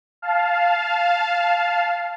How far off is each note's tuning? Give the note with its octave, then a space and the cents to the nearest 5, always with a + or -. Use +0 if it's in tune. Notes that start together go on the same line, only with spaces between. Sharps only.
F5 +0 A5 -15